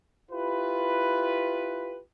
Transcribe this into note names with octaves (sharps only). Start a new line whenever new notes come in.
E4 F4 G4 B4